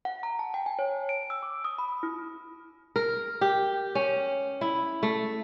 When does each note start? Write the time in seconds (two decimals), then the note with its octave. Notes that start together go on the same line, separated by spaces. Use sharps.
0.05 F#5
0.23 A#5
0.39 A5
0.54 G5
0.66 G#5
0.79 C#5
1.09 D7
1.30 E6
1.43 D6
1.64 D#6
1.78 B5
2.03 E4
2.96 A#4
3.41 G4
3.95 C#4
4.61 E4
5.03 A3